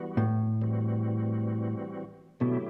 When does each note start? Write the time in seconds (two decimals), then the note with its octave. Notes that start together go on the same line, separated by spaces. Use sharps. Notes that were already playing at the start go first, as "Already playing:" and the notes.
Already playing: E3 G3 B3 F#4
0.17 A2
0.62 E3 G3 C4 F#4
2.40 B2 D3 F#3 A3 E4 G4